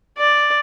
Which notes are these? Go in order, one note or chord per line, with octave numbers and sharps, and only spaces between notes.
D5